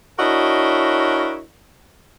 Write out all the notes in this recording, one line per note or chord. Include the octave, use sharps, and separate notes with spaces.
D4 E4 F#4 A#4 C#5 D#5